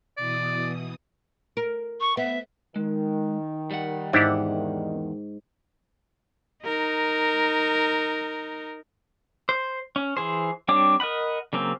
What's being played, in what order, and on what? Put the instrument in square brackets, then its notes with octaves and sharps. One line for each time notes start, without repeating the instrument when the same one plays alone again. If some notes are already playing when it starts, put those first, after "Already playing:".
[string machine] B2 E3 D#6 [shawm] D5
[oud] A#4
[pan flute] C#6
[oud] B3 [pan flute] E5
[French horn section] D#3 [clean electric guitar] G#3
[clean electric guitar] G3 F#5
[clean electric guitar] E2 F#5 [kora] G#2 [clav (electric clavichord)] D4 E4 G4
[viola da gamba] D#4 A#4
[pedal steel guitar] C5
C#4
E3 G#4 C5
G3 C4 D4 C#5 D6
A#4 D#5 F#5 B5
C#3 F#3 A#3 C4